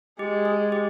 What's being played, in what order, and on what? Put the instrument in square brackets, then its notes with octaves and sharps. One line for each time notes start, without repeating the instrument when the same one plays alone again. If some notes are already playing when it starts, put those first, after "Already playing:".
[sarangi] G#3 [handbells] G4
[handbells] G#4
G4